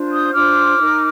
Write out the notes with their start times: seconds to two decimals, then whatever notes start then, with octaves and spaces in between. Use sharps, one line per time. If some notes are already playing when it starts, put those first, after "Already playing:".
Already playing: D4 F4 C5
0.11 D#6 G6
0.33 D4 F4 C5 D6 F6
0.77 D#4 A#4